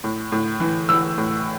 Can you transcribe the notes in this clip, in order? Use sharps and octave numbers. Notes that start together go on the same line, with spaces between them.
A2
A2
E3
E3 E6
A2